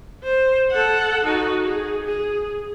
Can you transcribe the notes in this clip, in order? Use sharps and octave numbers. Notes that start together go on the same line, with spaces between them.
C5
A4 F#5
D#4 F#4
G#4
G#4